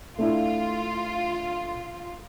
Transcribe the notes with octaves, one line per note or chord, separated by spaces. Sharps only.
A3 D4 E4 F4